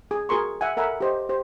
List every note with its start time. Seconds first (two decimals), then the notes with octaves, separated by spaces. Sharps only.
0.11 G#4
0.29 F#4 G#4 A#4 C6 C#6
0.61 E5 F#5 G#5
0.77 A4 A#4 E5 F#5 G#5 B5
1.01 G4 C5 D#5
1.29 G4 C5